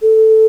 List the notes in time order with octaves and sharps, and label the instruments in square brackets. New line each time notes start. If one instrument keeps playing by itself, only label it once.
[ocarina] A4